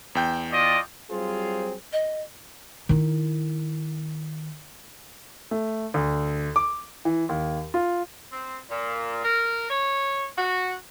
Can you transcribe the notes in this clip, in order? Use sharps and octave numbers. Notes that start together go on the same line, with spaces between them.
E2 G5 G6
F4 D5 D#5
F#3 G3 C4 F4 G#4 C5
D#5
D#3 E4
A3
D2
D6
E3
D#2
F4
C4
A#2
A#4
C#5
F#4